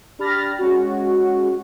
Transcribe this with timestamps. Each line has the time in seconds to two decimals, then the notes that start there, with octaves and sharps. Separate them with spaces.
0.19 D4 G4 B5 F6 A6 A#6
0.58 G#3 C#4 F#4